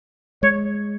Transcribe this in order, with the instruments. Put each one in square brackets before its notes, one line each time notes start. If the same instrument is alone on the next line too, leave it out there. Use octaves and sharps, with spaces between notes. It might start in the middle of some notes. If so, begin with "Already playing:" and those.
[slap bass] G#3 [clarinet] C#5